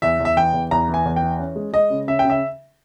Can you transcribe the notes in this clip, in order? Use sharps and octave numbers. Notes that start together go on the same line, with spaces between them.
E2 E5
E2
E5
E3 G5
E2
E2 A#5
E3
G#5
E2
G5
E3
C#4
G#3
G#3 D#5
C#3
C#3 E5
G5
C#3
E5